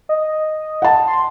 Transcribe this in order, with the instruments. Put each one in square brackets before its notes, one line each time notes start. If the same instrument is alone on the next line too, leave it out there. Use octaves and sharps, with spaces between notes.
[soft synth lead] D#5
[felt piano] F#5 A5
[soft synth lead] C6